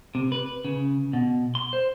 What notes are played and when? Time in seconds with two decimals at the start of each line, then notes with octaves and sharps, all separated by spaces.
0.15 C3
0.32 B4
0.65 C#3
1.13 B2
1.55 C6
1.73 C5